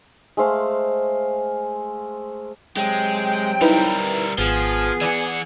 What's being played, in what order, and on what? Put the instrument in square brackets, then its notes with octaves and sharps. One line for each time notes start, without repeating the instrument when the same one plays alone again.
[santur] G#3 A3 C5 F5
[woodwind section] C3 F#3 G5 [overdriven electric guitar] G#3
[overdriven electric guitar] G3 A#4 [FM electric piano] D#4 E4 B4
[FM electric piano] G#1 [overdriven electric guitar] F3 [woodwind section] B3 G#4
[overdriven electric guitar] E3 F#5 [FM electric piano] D5